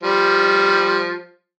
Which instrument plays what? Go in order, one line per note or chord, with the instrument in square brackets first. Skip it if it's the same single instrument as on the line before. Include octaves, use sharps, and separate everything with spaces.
[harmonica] F3 G3